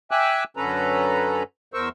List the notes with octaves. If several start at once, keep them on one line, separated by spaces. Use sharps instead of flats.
E5 G5 G#5 D6 E6 F#6
F#2 D3 C#4 A4 B4 A#5
E2 A#4 C5 C#6 E6